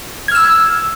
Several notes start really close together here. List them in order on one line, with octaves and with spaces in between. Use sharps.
G#6 F6 E6